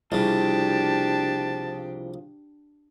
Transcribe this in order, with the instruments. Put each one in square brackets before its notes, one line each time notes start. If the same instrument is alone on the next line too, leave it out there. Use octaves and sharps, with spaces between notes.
[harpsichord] C2 C#3 [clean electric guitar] F3 [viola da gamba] D4 G4 [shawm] A5